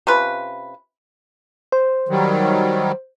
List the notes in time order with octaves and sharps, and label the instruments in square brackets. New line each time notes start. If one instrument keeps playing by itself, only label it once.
[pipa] C3 C#4 F4 B4
[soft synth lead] C5
[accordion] D#3 F#3 G3